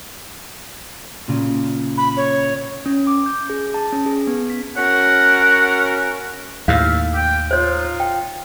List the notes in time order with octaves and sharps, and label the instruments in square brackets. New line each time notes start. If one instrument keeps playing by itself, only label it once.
[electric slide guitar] A#2 C#3
[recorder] B5
C#5
[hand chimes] C#4
D6
G6
G#4
A5
C#4
G#4
B3
B6
[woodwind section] C#4 F#4 A#4 [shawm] F#5
[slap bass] D#2 A2 [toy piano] F5 [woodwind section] E6 F6
[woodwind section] G5
[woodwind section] D#4 F4 [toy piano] C5 C#5
[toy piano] G5